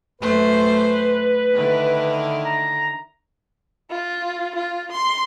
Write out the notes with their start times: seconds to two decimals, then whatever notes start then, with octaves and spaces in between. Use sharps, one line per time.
0.22 F#2 A3 B4 C5
1.54 D3 D#3 E4
2.44 A#5
3.90 F4
4.55 F4
4.92 C6